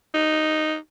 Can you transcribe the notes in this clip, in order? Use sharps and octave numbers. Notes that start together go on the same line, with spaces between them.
D#4